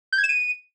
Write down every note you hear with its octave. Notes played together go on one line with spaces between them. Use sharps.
G6
G#6
E7
D#7